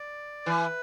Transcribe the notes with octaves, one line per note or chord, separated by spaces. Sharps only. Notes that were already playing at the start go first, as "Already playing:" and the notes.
Already playing: D5
E3 B4